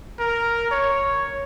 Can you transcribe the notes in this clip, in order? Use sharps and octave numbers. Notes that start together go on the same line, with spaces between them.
A#4
C#5